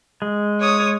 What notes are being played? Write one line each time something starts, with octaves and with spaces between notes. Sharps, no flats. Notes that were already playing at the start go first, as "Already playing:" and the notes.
G#3
C#5 D#6